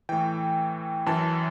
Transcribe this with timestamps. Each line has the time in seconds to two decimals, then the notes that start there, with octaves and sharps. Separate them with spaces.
0.09 A2 E3 G5
1.06 F#2 E3 A5